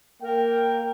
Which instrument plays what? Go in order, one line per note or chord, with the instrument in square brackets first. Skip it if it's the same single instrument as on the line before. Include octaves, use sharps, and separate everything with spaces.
[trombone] A#3 [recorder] A#4 [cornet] G5